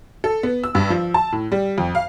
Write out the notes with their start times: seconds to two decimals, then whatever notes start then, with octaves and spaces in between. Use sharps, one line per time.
0.24 A4
0.43 B3
0.64 E6
0.75 G2
0.90 F3
1.14 A5
1.32 A2
1.52 G3
1.78 F2
1.95 F5